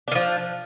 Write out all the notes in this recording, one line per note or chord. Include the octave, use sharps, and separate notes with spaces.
D#3 F3 D4